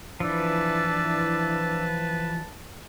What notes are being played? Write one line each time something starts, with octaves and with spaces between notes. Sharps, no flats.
E3 F3 D4 E4 B4 A5 E6